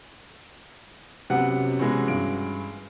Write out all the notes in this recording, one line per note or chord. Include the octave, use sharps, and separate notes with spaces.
F#2 C3 B3 F#5
B2 E3 G#3
G2 D7